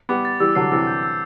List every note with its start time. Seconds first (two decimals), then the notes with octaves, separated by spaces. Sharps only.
0.09 G3 B3 D6
0.25 A6
0.40 E3 G3 E6
0.55 D3 F#3 C7
0.72 C3 E3 E6
0.87 G6
1.03 E6